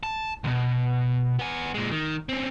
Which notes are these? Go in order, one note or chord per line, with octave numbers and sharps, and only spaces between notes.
A5
C#2 B2
B3 G#5
A#2 G#3
D#3
C4 C#4